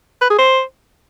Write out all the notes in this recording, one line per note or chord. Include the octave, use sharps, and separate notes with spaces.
B4
G#4
C5